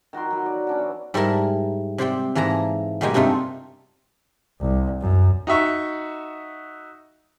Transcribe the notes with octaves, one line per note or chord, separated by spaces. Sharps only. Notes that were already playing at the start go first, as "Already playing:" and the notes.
D#3 F#4 A#4 C6
F#3 B5
D5
C#4 D4 F#4
E3
G#2 G3 E4 A#4 A5
C3 C5 D5 G5
G#2 E3 A#3 A5 A#5
B2 G3 G#3 A#3 G5 G#5
G2 C3 A3 D#4 F4
C2
F#2
D#4 F#4 E5 C#6